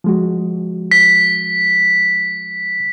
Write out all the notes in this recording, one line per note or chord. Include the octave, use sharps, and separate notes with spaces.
F3 G#3 F#4
B6